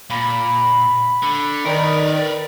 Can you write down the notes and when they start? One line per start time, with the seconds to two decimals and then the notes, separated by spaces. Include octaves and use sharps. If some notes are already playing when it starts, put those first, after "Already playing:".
0.10 A#2 B5
1.22 D3
1.65 D#3 A#4 B4 D5